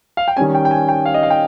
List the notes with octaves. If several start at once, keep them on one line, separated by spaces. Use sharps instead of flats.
F5
G5
D#3 G3 C#4 G#5
G5
G5
G#5
G5
F5
D#5
F5
G5